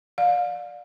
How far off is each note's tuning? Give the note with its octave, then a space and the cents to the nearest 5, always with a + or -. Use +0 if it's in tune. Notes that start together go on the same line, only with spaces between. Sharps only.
D5 +10 F5 +35